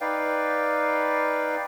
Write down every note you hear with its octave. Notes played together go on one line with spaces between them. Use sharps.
D#4 B4 D5 F5 G5